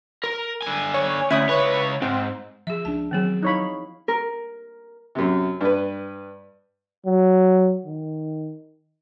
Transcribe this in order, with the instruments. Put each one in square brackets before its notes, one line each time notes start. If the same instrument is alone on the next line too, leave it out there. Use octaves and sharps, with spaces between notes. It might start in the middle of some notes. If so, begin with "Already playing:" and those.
[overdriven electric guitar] A#4
D3 G#5
[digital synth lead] C#5
[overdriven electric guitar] D2 [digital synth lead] C#4 [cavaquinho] E4 B5 D#6
[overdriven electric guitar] C#2 C#5 [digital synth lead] B4
[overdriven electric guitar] G#2 [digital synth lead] C4
[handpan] F3 [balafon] G#4 E5
[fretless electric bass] C#2 D4 [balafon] A5
[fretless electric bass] D#3 F#3 [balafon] B3 C4 G#4
[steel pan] D#4 C#5 B5 [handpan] E4 F5
[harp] A#4
[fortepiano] F#2 C3
G2 B4
[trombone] F#3
D#3